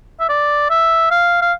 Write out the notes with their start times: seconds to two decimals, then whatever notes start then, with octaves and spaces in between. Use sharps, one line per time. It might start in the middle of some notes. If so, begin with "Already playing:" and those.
0.20 E5
0.29 D5
0.70 E5
1.11 F5
1.42 F5